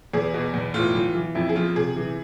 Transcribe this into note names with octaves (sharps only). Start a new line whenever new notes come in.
E2 G#4
B2
E2
A2 F4
E3
E3
F2 E4
G#4
F3 F4
C3 G#4
E3